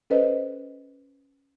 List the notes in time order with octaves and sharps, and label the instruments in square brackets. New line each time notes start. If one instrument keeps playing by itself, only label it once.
[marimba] C#4 A4 B4 C5 D#5